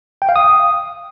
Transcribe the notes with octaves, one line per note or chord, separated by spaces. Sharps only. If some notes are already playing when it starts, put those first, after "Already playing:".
G5
F5
D#6